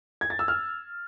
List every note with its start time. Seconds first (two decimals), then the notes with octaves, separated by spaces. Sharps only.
0.21 G#6
0.30 A6
0.39 E6
0.48 F6